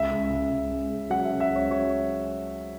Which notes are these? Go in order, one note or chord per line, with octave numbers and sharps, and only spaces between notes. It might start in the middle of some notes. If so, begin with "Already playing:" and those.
Already playing: C#2 E5
C#2
C#2
C#2
C#2
C#3
F#3 F#5
E5
C#3
E5
C#2
C#5
F#3 C#5